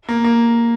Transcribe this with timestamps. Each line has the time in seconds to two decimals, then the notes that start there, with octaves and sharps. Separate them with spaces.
0.09 A#3
0.24 A#3